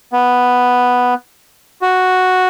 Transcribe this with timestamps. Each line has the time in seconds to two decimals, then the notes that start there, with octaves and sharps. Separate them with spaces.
0.13 B3
1.82 F#4